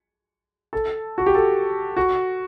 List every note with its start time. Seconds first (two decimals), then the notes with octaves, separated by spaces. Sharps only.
0.73 A4
1.18 F#4
1.26 G4
1.35 A4
1.97 F#4